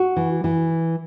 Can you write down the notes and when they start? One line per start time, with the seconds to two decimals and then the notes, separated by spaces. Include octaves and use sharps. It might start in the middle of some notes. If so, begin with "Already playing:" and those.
Already playing: F#4
0.16 E3
0.44 E3